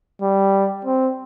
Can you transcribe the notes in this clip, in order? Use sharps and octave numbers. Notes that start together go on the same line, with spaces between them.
G3
C4